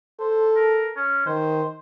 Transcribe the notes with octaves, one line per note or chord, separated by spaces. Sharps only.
A4 C5
A#4
C#4
D#3 C5